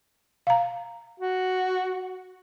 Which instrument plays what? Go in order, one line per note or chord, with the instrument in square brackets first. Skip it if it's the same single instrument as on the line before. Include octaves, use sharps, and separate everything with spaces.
[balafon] F5 A#5
[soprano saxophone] F#4